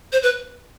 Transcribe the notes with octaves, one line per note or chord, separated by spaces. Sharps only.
C5
B4